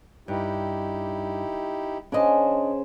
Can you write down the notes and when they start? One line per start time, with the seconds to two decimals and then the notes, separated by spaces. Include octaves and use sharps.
0.28 G2 D#4 E4 G4
2.12 C#3 D4 C5 D5 D#5